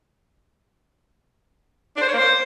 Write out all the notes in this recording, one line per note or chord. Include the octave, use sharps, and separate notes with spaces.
D4
C5
C#5
A#3
C5